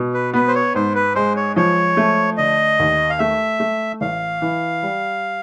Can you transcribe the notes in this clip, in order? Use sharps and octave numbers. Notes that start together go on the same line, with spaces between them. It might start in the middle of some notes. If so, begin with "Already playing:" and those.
Already playing: B2
B4
B3 B4
C5
C#5
G#2 C5
B4
G#3 C5
C#5
F3 C#5
A3
D3 D#5
D#2
F5
A3 E5
A3
A1 F5
E3
G3